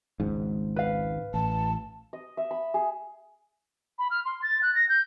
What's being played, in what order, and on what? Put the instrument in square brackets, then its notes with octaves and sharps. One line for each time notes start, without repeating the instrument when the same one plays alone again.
[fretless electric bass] G#1 C#2 G#2
[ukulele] B4 F5
[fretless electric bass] A1 [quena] A5
[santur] D#5
E5
B5
G#4
[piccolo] B5
F6
C6
A6
F#6
A#6
G6